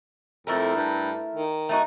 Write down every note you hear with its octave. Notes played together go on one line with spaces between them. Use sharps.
F2 A3 E4 A#4
G2
D#3
A3 D#4 F#4